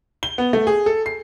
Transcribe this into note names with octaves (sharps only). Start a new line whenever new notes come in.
G7
B3
A3
G#4
A4
C7